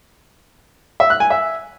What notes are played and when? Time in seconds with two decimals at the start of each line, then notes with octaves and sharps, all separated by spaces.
1.00 E5
1.10 F#6
1.20 G#5
1.30 E5